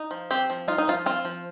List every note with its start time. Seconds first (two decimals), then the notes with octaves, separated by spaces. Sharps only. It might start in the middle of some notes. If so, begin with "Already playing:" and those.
Already playing: D#4
0.11 F3
0.31 C4 G4
0.50 F3
0.68 D#4 F4
0.78 D#4
0.87 F3 F4
1.06 C4 F4
1.25 F3